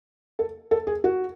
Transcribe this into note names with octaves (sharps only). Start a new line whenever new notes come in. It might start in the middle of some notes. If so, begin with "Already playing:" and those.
A4
A4
G#4
F#4